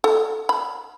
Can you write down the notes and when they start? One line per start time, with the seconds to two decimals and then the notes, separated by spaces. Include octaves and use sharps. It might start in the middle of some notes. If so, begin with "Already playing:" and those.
0.04 A4
0.49 B5